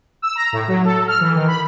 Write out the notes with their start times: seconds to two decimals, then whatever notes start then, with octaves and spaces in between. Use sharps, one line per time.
0.22 E6
0.35 A#5
0.53 A2
0.68 F#3
0.85 A4
1.08 F6
1.21 E3
1.35 D#3
1.48 B5